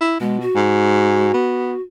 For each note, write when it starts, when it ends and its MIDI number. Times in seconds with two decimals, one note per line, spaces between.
0.01 0.18 64
0.20 0.45 47
0.20 0.40 56
0.41 1.81 66
0.56 1.30 44
1.34 1.74 59